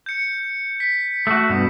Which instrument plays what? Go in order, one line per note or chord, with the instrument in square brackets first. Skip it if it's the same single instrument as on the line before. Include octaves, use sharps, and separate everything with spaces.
[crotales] G6 C#7
B6
[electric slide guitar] A3 F#4
G2 B2